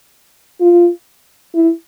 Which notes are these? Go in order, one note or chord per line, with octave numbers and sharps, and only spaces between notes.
F4
E4